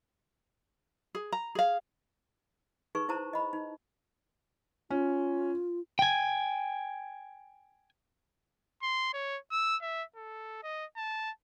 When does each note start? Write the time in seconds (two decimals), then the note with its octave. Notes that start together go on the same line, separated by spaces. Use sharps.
1.15 G#4
1.32 A#5
1.55 G#4 F5
2.95 D#4 G#4 B4 C#6
3.09 E4 C5 A5 A#5
3.33 D#5 B5
3.53 D#4
4.90 C#4 F4
5.99 G5 G#5
8.82 C6
9.14 C#5
9.51 E6
9.81 E5
10.16 A4
10.63 D#5
10.96 A5